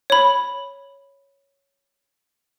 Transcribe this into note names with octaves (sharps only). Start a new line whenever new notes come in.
C#5 B5